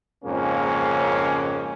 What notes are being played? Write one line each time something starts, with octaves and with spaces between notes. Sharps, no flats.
F2 G#2 C#3 A#3 C#4